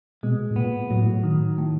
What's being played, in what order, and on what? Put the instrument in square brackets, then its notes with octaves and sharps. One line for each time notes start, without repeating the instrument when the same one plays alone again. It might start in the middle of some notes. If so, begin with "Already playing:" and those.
[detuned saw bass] B2 [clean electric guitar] G#3
[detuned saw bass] A2
[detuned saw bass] A#2 [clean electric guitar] B3
[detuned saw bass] A2 [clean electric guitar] F#3
[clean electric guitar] D#3
A2